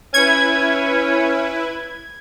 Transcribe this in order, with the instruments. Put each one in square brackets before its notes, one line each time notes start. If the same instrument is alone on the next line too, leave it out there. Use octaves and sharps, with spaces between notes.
[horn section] C#4 [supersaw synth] E4 B4 [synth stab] G#6